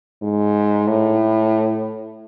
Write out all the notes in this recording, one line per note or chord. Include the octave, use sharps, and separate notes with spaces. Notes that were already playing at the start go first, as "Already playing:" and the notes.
G#2
A2